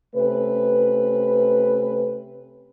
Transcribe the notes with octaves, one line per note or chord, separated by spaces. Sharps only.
C3 A3 C#4 B4